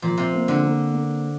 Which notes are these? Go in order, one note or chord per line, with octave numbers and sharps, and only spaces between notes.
A#2 F3
C3
A#3
D3
A#3
A#3